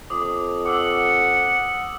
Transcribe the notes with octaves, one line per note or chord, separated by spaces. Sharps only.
F2 D6 D#6
F#5 D6 E6 F#7